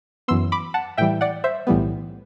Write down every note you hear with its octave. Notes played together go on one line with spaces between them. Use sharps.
F#2 E3 B3 C6 E6
B5 D6
F#5 A5
A2 E3 G3 E5 G5
D5 F#5
C5 E5
B1 A2 E3 G3 B3